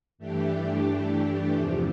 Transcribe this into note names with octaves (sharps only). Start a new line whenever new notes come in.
G2 E3 A3 D4 G4
E2 C3 F3